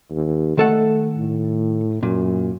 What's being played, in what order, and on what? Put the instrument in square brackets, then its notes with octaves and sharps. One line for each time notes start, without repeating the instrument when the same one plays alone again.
[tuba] D#2
[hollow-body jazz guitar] D#3 A4 F#5 [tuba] A3
[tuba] A2
[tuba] F#2 [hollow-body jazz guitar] A#2